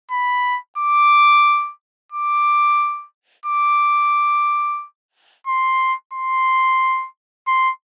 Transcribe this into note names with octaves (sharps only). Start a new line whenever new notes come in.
B5
D6
D6
D6
C6
C6
C6